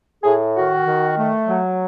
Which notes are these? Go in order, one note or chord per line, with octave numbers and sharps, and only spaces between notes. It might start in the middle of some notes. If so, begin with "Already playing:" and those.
A2 G#4
D#3 F#4
D#3
A3
F#3